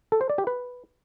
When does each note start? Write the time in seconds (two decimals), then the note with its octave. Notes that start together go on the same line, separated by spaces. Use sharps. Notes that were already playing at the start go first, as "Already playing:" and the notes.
0.12 A4
0.21 C5
0.30 D5
0.38 G4
0.47 B4